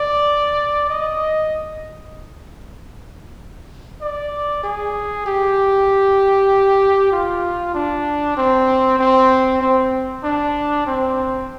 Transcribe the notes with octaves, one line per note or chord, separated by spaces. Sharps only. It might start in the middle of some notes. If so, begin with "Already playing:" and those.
Already playing: D5
D#5
D5
G#4
G4
F4
D4
C4
C4
C4
D4
C4